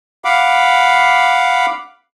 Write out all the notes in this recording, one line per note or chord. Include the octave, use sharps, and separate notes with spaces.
F5 F#5 B5 D6